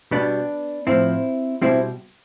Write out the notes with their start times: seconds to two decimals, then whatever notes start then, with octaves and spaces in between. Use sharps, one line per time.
0.11 B2 G3 B3 D4
0.87 A2 F3 C4 E4
1.62 B2 G3 C4 E4